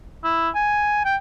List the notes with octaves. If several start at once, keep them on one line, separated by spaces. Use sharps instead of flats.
E4
G#5
G5